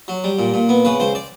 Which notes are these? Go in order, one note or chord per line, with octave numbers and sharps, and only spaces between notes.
F#3
G3
A#2
A#2
B3
C#3 B4
C#2 C5
D5